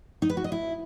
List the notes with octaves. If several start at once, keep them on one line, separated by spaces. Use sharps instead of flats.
D#4
B4
F#4
D#5
E4